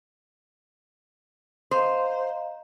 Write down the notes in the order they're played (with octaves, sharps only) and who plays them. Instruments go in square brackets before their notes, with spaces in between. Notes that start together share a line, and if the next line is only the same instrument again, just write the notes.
[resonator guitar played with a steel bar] C5 [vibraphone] D#5 F5 A#5